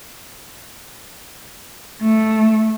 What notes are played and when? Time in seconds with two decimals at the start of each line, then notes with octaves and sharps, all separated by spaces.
2.01 A3